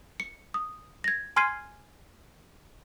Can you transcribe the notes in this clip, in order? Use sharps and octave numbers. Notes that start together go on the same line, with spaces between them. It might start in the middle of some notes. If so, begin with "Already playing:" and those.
C#7
D#6
G#6 A#6
G#5 C6 F6 G#6 C7 D#7